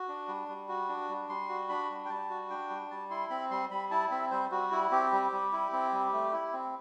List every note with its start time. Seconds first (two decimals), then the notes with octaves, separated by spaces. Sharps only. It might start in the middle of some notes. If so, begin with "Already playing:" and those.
Already playing: F#4
0.09 D4
0.28 G3
0.48 G3
0.69 F#4
0.89 D4
1.09 G3
1.29 G3 C6
1.49 F#4
1.69 D4 B5
1.89 G3
2.05 G5
2.09 G3 A5
2.30 F#4
2.50 D4 G5
2.70 G3
2.91 G3 A5
3.10 E4 C6
3.30 C4 B5
3.51 G3 C6
3.71 G3 B5
3.91 E4 A5
4.11 C4 E5
4.31 G3 C5
4.51 G3 F#4
4.72 E4
4.92 C4 G4
5.12 G3
5.32 G3
5.52 E4
5.73 C4
5.93 G3
6.13 A3
6.33 E4
6.53 C4